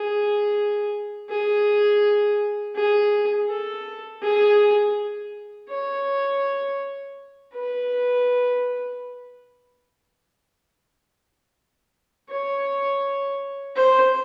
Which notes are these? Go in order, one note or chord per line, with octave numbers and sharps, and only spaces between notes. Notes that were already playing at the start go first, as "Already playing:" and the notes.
Already playing: G#4
G#4
G#4
A4
G#4
C#5
B4
C#5
C5